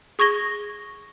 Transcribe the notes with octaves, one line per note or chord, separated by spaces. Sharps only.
G#4 C#6 G#6 A#6 G7